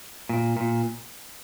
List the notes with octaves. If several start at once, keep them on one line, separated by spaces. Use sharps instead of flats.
A#2
A#2